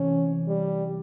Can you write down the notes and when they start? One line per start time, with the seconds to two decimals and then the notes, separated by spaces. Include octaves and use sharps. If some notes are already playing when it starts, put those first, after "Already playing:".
Already playing: C3 E3 A3 C#4
0.48 G3